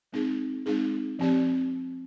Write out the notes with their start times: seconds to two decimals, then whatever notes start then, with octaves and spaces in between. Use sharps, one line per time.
0.13 G#3 C4 D#4 G#4
0.66 G#3 C4 D#4 G#4
1.19 F3 C4 G4 D5